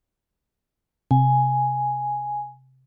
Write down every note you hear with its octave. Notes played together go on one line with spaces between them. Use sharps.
C3 G#5